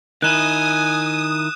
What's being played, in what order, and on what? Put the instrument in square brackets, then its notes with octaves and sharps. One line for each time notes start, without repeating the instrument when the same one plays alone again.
[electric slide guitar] D#3 D#4 E4 [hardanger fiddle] G#5 [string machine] D#6 [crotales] F#6 E7